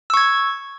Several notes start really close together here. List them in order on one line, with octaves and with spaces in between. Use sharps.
E6 C#6 G#6